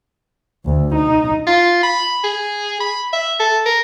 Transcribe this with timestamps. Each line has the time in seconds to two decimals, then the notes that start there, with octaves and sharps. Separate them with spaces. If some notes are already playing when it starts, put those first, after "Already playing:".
0.66 D2
0.95 D#4
1.47 F4
1.83 B5
2.24 G#4
2.80 B5
3.13 E5
3.40 A4
3.66 A#4